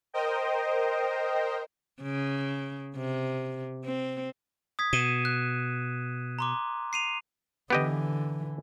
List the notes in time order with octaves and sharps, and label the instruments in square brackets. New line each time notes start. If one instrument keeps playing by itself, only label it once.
[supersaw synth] A#4 C5 D#5 G5
[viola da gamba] C#3
C3
C4
[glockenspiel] D#6 G#6 B6
[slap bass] B2 [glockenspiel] D#7 E7
[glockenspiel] F#6
A#5 C6 D6
C7 D#7 F7
[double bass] D3 E3 [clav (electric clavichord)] B3 G4 D#5